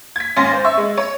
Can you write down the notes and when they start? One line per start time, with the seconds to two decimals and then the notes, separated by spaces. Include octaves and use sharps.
0.16 G#6 B6
0.36 G#1 C#4 F5 C6 A6 A#6
0.53 C5
0.64 E5 C#6
0.78 G#3
0.97 C#5